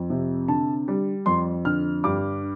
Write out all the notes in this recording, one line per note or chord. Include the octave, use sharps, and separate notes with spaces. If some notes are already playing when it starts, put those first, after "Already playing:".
Already playing: F2
C3
D3 A5
G3
F2 C6
D3 F6
G2 D6